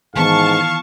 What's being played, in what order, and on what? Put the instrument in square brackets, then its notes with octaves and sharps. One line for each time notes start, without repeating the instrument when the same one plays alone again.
[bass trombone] G#2 [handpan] D#3 E3 B3 [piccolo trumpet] F5 [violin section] A5 C#6